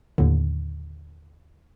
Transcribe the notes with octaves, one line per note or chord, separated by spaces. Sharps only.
D#2 A2 D3